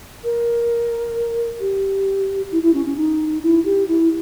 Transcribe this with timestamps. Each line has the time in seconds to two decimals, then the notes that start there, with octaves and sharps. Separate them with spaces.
0.24 A#4
1.59 G4
2.51 E4
2.62 E4
2.73 C#4
2.85 C#4
2.97 D#4
3.42 E4
3.65 G4
3.87 E4